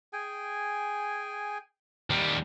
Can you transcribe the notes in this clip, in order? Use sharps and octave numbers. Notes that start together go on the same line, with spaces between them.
G#4 G5 G#5
D#2 G3 A#4